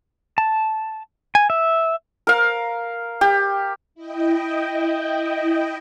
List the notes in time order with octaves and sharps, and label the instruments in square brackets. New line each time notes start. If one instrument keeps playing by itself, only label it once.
[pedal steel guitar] A5
G#5
E5
[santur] A#4 F5
G4
[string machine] E4 D#5 G5